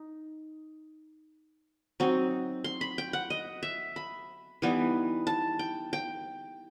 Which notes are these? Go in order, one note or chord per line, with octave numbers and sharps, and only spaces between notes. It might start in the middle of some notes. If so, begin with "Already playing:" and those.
Already playing: D#4
F#3 C4 D#4
C6
B5
G5
F#5
D#5
E5
B5
E3 G3 B3 D#4
A5
G5
G5